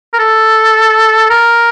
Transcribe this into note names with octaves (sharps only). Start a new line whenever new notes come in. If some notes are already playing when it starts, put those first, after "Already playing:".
A#4
A4
A#4